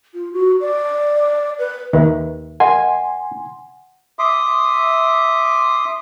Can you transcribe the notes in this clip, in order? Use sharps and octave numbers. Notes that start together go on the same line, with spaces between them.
F4
F#4
D5
B4
D#2 D#3 B4 E5
A#4 D#5 F#5 G#5 C6
E5 C6 D6 D#6